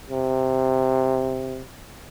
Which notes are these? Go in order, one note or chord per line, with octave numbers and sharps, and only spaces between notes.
C3